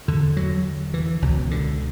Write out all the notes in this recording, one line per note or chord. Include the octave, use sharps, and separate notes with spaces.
E2 D3
F#3
E3
C#2 B2
D3